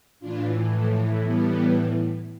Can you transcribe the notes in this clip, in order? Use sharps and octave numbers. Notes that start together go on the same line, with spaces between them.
A2 E3 D4 F4
F3 A3
G3 B3